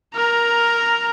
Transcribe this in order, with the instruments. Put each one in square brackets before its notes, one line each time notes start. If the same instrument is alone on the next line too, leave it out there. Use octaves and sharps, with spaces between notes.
[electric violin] A#4 A#5